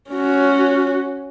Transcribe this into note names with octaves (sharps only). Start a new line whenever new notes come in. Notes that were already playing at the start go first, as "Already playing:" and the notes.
C#4 F#4